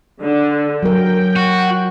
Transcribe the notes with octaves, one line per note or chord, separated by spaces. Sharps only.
D3
F#3 A#4 G5
F#4